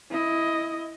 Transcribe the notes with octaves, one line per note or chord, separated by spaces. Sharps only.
E4 D#5